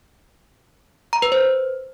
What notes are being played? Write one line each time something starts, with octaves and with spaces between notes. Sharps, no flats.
A#5
B4
C5